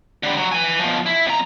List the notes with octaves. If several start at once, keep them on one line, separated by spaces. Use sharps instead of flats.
D3 G3
F#3
B4 G#5
B2 F3
E4
F2 A#5